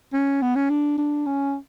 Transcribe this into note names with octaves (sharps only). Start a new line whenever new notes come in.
C#4
B3
C#4
D4
D4
C#4